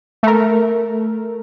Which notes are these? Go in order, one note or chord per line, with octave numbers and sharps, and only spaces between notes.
A3 A#4